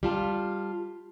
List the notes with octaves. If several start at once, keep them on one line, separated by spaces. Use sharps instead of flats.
G3 F4 A5